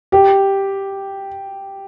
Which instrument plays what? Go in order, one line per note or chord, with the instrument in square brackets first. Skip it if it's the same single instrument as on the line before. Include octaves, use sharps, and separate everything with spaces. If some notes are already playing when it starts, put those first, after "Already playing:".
[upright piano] G4